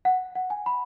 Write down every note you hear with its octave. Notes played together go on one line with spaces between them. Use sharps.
F#5
F#5
G#5
B5